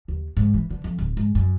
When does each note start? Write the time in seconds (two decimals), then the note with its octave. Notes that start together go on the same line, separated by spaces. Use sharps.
0.08 D#2
0.37 G#2
0.54 E3
0.70 D3
0.84 F2
0.99 D1
1.17 G#2
1.35 F#2